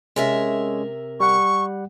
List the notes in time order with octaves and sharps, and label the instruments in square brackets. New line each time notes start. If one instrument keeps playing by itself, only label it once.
[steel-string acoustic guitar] C3 A#4 E5 [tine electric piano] G#3 C#4
[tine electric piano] G3 F#5 [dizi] C#6